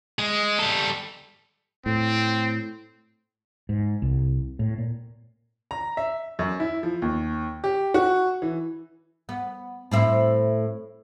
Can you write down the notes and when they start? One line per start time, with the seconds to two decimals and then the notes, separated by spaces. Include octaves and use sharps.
0.19 G#3 G#4
0.59 G3 A4
1.86 A2 C4
3.69 G#2
4.02 C2
4.59 A2
4.78 A#2
5.71 A#5
5.97 E5
6.39 F#2
6.60 E4
6.83 F3
7.02 D#2
7.64 G4
7.94 F#4
8.42 E3
9.29 B3
9.91 A2 C4 E4